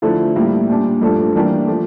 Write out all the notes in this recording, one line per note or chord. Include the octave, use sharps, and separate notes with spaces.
D3 F3 A3 E4 A4
A2 G3 A#3 E4 A#4
A#2 G3 D4
G2 F3 A3 D4 A4
E3 G3 A#3 D4 G4
F3 A3